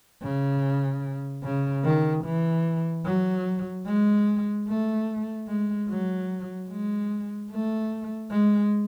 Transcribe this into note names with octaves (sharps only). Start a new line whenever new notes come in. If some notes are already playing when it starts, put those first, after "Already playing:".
C#3
C#3
D#3
E3
F#3
G#3
A3
G#3
F#3
G#3
A3
G#3